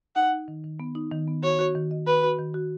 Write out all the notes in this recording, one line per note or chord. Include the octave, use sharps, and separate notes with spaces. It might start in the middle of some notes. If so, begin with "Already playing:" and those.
D#4 F#5
D#4
D#3
D#3
B3
D#4
D#3
B3
F#4 C#5
F#4
D#3
D#5
F#4 B4
F#4
D#3
F#4